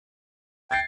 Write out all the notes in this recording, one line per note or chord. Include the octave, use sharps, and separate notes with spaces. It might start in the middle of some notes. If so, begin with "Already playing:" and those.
G5 G#6 A6 C7